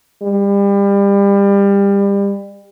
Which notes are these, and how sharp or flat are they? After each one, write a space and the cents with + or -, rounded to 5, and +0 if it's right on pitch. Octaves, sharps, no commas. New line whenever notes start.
G3 +30